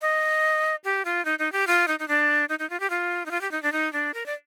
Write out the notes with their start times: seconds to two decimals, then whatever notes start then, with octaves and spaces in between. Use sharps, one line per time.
0.02 D#5
0.84 G4
1.05 F4
1.25 D#4
1.39 D#4
1.52 G4
1.67 F4
1.88 D#4
1.99 D#4
2.08 D4
2.49 D#4
2.59 D#4
2.70 F4
2.80 G4
2.90 F4
3.26 D#4
3.31 F4
3.41 G4
3.51 D#4
3.63 D4
3.72 D#4
3.93 D4
4.14 A#4
4.26 D5